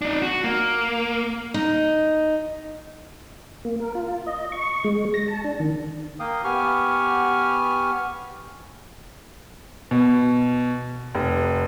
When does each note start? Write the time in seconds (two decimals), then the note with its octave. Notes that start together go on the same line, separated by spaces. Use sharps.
0.02 D4 D#4
0.22 F#4
0.44 A#3
1.54 D#4
3.65 A#3
3.80 A#4
3.95 F4
4.26 D#5
4.52 C#6
4.84 G#3
5.14 A#6
5.28 A5
5.44 D4
5.60 D#3
6.20 A#3 F5 G5 D#6
6.44 B3 G4 G#5 C#6 F6
9.91 B2
11.15 F1